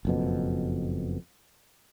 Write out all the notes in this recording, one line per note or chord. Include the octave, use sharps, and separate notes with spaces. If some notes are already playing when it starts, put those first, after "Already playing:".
F#1 F2 B2